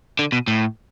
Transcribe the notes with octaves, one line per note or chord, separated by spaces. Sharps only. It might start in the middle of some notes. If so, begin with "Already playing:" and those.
D3
B2
A2